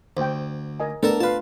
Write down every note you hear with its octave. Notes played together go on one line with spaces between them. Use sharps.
D2 C5 G5
A#4 D#5 G#5
A3 B3 D4 A4 A#4 A5
F4 B4 F5 A5